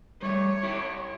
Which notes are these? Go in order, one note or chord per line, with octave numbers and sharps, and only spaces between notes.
G3 A3 C#5
E4 G4